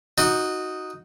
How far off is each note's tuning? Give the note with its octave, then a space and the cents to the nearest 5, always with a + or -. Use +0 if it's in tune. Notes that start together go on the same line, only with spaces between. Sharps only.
D#4 +0 F#4 -5 D#5 -30